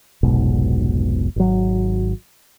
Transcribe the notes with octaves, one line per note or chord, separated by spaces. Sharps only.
F1 B1 G#2 B2
G#1 F#3